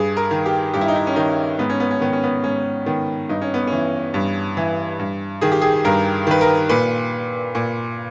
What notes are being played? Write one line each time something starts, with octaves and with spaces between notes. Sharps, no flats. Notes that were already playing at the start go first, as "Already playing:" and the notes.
Already playing: G2 G#4
A#4
D#3
G4
G2 G4
E4
D#4
E4
C#4
D#3 D#4
G#2 B3
C#4
B3
C#4
D#3 B3
C#4
B3
G#2 C#4
D#3 B3
G2 D#4
C#4
B3
E3 C#4
G2
E3
G2
D#3 G#4
G4
G#4
G2 A#4
D#3 B4
A#4
A#2 B4
A#2